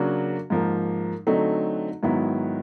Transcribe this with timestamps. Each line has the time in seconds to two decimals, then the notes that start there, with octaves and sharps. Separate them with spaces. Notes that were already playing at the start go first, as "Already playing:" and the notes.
Already playing: C#3 F#3 A#3 D4 F#4
0.50 G#2 F3 A#3
1.27 D3 F#3 A3 C4 D#4
2.03 G#2 D#3 F#3 B3 E4